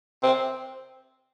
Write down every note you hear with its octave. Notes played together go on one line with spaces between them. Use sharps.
C4